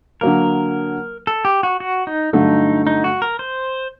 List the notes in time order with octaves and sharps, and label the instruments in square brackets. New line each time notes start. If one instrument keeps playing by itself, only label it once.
[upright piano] D3 F#3 A#3 [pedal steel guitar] A#4
[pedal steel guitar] A4
G4
F#4
F#4
D#4
[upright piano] G2 D3 F#3 A3 [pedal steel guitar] D#4
[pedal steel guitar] D#4
F#4
A#4
C5